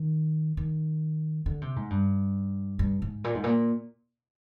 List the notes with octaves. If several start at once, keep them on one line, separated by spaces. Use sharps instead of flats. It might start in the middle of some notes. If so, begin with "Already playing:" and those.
Already playing: D#3
D#3
D3
C3
G#2
G2
G2
G#2
A#2
G#2
A#2